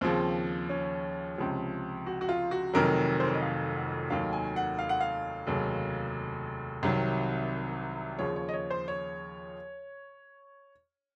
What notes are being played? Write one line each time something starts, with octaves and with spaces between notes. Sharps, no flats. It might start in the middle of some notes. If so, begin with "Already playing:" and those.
D#2 C#3 F3 C4
C#4
C#2 C3 F3
F#4
F#4
F4
F#4
F1 F2 D#3 F#3 A#4
C5
C#5
D#5
F5
F#5
F1 D#2 D#3 F#3 F5
G#5
F#5
F5
F#5
F5
F1 D#2 C#3 F#3
C2 C3 D#3 F#3
D#2 C#3 F3 C#5
C#5
D#5
C#5
C5
C#5